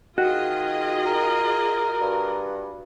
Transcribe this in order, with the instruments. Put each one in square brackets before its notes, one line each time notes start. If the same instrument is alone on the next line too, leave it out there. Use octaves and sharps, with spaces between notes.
[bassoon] D#3 [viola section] F4 G#4 D#5 [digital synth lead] F#4
[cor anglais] A#4
[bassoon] G2